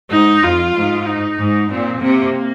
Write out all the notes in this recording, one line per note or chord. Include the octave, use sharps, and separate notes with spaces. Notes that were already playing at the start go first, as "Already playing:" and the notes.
G#2 D#4
F2 F4
G#2
D#4
G#2
A#2 C4
C3 A#3